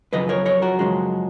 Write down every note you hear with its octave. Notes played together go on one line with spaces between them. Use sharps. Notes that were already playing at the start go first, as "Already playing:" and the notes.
F#2 C#3 F3 B4 D#5
A#4 C#5
A#4 C#5
F#4 A#4
F#2 C#3 F3 G#3